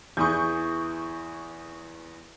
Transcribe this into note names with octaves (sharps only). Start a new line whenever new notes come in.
E2 E3 G#4 C#6 D#6 G6